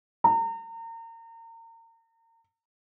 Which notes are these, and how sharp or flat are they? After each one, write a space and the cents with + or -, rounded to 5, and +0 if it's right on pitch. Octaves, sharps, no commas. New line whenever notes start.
A#5 -35